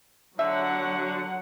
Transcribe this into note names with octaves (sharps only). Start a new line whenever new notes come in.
D3 F#3 E5 F#5